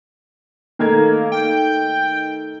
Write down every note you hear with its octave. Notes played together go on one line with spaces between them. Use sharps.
D#3 A3 A#3 G#6
G5